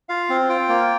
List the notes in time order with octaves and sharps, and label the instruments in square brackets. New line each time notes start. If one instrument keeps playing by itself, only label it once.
[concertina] F4 F5
C4
F4 G5
A#3